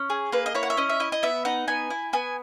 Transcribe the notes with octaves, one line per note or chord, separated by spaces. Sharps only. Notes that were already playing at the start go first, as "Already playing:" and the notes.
Already playing: C#4
G#4
A#3 B4
D#5
E4 C#5
F#5
E5
C#4 D#5
E5
E4 D#5
D#5
B3 E5
D#4 F#5
B3 G#5
E4
B3 G#5